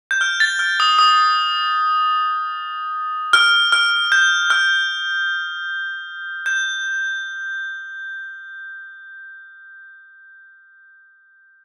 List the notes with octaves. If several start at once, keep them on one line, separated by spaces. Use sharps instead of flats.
G6
F6
A6
F6
D#6
D#6
F6
F6
G6
F6
G6